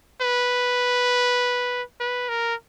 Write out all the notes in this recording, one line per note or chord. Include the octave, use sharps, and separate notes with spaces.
B4
B4
A#4